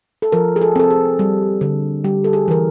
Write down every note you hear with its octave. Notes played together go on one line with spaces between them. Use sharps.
A4
F3 A#4
G#4
A4
C4 A4
G#4
G3
D3
G3 G4
A4
G#4
E3 A#4